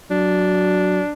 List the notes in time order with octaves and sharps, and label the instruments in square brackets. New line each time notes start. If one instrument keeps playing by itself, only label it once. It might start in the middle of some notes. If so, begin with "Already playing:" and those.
[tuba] F#3 [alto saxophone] D4